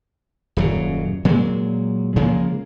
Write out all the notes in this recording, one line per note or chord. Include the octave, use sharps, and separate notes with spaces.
D#1 F#2 C#3
A#2 F#3 G#3
C#3 F3 G#3 A#3